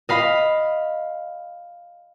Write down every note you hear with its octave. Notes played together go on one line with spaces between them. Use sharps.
D#5 F5 B5